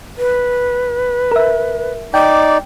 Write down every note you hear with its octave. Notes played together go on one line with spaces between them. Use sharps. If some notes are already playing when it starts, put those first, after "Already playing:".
B4
A#4 E5
D#4 D5 G5 D6